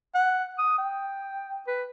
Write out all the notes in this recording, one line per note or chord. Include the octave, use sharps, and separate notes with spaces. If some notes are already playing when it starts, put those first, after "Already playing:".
F#5
D#6
G5
B4